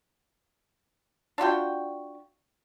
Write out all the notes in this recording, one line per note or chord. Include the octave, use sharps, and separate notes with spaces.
D4 F4 F#4 G5